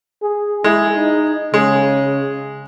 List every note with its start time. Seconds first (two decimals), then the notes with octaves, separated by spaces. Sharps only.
0.22 G#4
0.64 G#3 E4
0.95 D#4
1.54 C#3 G#3